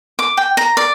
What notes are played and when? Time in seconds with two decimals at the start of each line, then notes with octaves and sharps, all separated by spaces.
0.19 D6
0.37 G5
0.57 A#5
0.77 D5